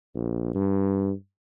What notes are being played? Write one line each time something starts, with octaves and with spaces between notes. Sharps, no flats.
A#1
G2